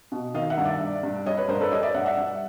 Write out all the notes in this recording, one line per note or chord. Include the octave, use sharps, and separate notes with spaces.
B2
D#3 D#5 F5
E5 F#5
G2
D5 E5
G2
G2
G3 C#5 D#5
B4 C#5
G2 A#4 C5
A4 B4
G3 C#5 D#5
D5 E5
G2 E5 F#5
E5 F#5
G3